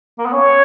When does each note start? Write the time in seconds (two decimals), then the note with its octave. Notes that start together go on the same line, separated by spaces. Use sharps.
0.18 A#3
0.26 B3
0.33 C#4 C#5